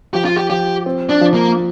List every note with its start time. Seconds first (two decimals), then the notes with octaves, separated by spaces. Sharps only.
0.14 F3 G4
0.25 F4
0.37 G4
0.50 F3 G4
0.86 C4
1.09 D4
1.21 F3
1.34 A#3